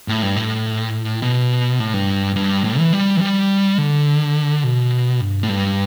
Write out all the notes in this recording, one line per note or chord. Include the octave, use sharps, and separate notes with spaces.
A2
G2
A2
B2
A2
G2
G2
A2
E3
G3
E3
G3
D3
B2
G2
A2
G2